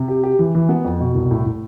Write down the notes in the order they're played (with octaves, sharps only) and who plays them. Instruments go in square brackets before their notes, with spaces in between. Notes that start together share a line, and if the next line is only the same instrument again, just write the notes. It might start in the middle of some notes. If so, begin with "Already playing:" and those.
Already playing: [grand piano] C3
G4
G4
E3
E3
B3
F2
B2
C2
A2
A2